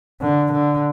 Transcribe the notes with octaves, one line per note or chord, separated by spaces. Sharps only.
D3
D3